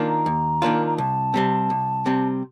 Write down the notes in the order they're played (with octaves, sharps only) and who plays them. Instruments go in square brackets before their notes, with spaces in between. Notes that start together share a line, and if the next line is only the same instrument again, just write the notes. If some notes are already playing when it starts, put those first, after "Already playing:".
Already playing: [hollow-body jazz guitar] D#3 A#3 D4 F4
[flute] A#5
[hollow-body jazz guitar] D#2
D#3 A#3 D4 F4
[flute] A#5
[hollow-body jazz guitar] C2 [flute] A5
[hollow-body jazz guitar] C3 G3 C4
C2
C3 G3 C4